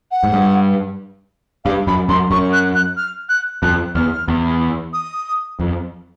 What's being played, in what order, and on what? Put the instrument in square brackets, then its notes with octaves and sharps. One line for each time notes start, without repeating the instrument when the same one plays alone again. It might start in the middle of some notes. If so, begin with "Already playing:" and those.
[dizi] F#5
[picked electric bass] G#2
G2
[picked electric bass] G2 [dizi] F5
[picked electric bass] F#2 [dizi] B5
[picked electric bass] F#2 [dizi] C6
[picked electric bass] F#2 [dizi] C#6
[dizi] F#6
F#6
F6
F#6
[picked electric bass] F2 [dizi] F#6
[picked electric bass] E2 [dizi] F6
[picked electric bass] E2
[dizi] D#6
[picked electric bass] F2